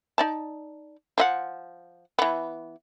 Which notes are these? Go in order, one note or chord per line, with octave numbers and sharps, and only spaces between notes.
D#4 D5 A5
F3 D#5 F#5
E3 B3